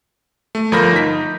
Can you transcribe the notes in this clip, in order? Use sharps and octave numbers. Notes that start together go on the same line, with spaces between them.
A3
G1 F3 A#4 B5 G6 A#6
D#4 B6